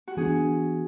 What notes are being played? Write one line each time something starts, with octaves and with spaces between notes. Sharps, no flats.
F#4
E3 B3 D4 G#4